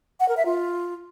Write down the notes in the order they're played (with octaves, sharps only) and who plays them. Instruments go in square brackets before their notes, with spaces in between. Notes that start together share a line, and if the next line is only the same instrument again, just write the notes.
[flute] F#5
A#4
E5
F4